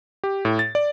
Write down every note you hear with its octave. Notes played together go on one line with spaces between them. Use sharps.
G4
A2
A6
D5